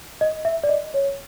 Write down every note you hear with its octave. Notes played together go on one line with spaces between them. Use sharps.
D#5
E5
D5
D#5
C#5